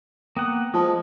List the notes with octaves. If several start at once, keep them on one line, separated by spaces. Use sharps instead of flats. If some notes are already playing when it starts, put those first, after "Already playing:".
A#3 B3 F#5 G5 D#6
F3 G#3 C5 A5 D#6